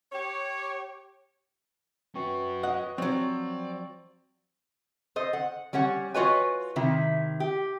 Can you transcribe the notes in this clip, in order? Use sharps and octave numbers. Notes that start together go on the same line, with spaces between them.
G4 C#5
C#4 F#4 B4 G5 C#6
D#5 F#5
F3 F#3 C4 D5 C#6
A4 C5 D#5
F#5
G3 C#4 C#5 F#5
F4 F#4 B4 C#5 D#5 G#5
C3 D#3 E4
G4